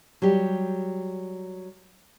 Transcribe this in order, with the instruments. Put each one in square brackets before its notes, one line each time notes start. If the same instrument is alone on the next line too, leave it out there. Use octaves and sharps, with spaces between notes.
[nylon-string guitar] F#3 G3 G4